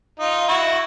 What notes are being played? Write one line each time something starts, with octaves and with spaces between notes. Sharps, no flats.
D#4 F4
E4 F#4